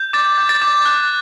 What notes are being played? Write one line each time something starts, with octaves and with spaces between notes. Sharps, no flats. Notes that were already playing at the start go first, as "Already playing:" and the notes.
Already playing: G6
D6 A6
G6
A6
D6
F#6